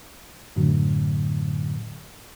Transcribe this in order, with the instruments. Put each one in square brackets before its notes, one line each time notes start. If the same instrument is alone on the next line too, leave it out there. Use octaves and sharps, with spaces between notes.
[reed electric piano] F#2 A2 D3 F#3